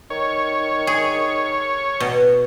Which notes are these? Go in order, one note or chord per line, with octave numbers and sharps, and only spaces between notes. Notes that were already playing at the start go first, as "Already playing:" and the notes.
D#3 C#5
G#4
B2